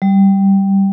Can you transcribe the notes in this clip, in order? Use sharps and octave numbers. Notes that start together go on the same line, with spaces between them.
G3